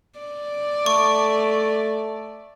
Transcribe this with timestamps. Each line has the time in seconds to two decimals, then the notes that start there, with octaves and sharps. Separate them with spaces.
0.19 D5
0.86 A3 C#6